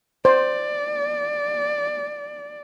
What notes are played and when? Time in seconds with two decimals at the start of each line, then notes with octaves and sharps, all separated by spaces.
0.25 C5 D5